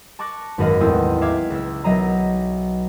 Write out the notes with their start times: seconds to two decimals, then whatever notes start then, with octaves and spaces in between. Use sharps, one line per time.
0.19 A5 C#6 D6 F#6 A#6 C#7
0.58 G#1 F#2 B4 D#5 F5 A#6
0.80 A1 E2 G#3 C4 D#6 E6
1.21 E5 F5 D6 G#6 C7
1.50 C#2 E6
1.84 B1 F#3 D#5 E5 A#5 C7